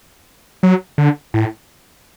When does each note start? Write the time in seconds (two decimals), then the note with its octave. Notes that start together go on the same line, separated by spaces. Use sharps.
0.63 F#3
0.98 D3
1.34 A2